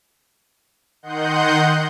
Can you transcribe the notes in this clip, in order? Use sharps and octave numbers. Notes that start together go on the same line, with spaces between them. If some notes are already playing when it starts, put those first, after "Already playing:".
D#3 D#5 F#5 C6 G6